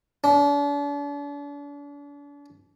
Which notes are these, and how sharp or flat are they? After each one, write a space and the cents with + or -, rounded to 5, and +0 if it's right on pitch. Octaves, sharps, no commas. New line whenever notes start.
D4 -40